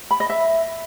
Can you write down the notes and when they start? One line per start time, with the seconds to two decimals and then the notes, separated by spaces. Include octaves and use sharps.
0.11 B5
0.20 D#5
0.30 E5